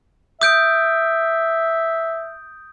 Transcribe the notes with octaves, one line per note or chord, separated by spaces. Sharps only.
E5 D#6 G6 D7